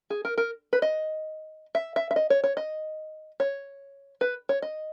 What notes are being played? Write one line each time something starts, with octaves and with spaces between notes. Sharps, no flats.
G#4
A#4
A#4
B4
D#5
E5
E5
E5
D#5
C#5
C#5
D#5
C#5
B4
C#5
D#5